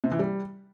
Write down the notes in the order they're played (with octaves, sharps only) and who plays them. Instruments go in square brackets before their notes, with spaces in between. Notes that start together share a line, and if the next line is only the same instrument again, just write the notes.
[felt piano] C3
E3
G3